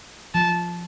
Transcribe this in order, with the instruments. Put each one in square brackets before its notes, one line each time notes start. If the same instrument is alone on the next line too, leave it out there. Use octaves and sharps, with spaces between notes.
[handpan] F3 [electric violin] A5